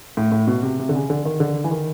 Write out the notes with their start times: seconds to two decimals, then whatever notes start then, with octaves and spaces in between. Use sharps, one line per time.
0.17 A2
0.32 A2
0.47 B2
0.63 C3
0.79 C3
0.89 D3
0.95 C#3
1.10 D3
1.25 D#3
1.40 D3
1.64 E3
1.71 D#3